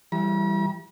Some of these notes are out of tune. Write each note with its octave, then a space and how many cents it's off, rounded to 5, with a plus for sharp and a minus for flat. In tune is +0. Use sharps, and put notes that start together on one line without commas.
E3 +25 G3 +0 B5 -45